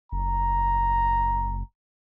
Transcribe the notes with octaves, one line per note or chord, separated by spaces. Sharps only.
F#1 A#5